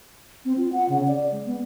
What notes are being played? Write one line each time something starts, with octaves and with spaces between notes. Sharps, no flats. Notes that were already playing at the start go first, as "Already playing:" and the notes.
C4
F4
F#5
C#3
D5
G#3
B3